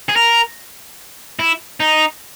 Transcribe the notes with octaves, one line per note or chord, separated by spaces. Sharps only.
G#4
A#4
E4
D#4